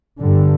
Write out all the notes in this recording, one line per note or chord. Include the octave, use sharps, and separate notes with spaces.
G2 D3